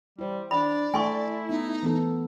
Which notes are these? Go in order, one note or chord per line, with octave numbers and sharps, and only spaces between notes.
G3 E4 C5
D4 D5 B5
A3 E4 A4 G#5 C6 C#6
B3 D#4
E3 B3 A4